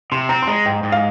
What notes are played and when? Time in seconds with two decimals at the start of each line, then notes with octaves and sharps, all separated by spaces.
0.12 C3 C6
0.29 C4 A#5
0.42 C6
0.47 G#3 A#5
0.66 G#2 G5
0.83 G#2
0.92 F5